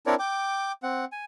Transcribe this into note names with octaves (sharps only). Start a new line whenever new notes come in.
C4 D4 E4 A#4 C#5 D5
G5 D6
C4 F#5
G#5